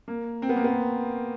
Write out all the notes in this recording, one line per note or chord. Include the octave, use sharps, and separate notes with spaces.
A#3
C4
B3
A#3
B3